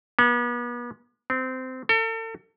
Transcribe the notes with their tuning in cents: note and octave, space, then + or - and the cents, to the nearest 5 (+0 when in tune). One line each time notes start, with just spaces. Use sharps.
B3 -40
C4 -20
A4 +40